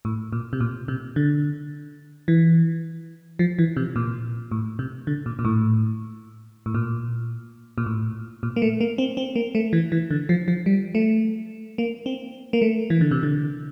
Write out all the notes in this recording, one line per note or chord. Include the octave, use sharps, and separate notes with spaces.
A2
A#2
C3
A#2
C3
D3
E3
F3
E3
C3
A#2
A2
C3
D3
A#2
A#2
A2
A2
A#2
A#2
A2
A#2
A#3
A3
A#3
C4
C4
A#3
A3
E3
E3
D3
F3
F3
G3
A3
A#3
C4
A#3
A3
E3
D3
C3
D3